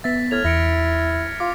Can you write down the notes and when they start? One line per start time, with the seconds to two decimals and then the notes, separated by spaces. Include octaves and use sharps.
0.04 B3 E5 A6 B6
0.31 A2 F6 G#6 F7
0.44 E2 E4 A#6 C#7 D7
1.40 F4 D6